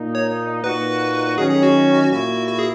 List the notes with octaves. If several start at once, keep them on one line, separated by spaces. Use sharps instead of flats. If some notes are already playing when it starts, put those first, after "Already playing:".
Already playing: A#2 A#3 D#4
C#5
A#2 A#3 D#4 F#4 B4
D#3 F#3 C#4 G#4
G#4
F#4
A#2 A#3 E4 F#4
F#4
G#4